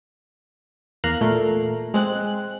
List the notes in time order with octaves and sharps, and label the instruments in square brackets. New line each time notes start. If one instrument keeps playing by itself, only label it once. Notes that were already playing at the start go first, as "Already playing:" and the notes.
[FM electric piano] E2 A#3 A#5 F6 F#6 C7
A#2 A3 A#4
G#3 C4 F#6